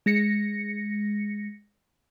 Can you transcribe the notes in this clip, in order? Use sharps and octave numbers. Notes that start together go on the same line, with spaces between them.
G#3 A#6 C#7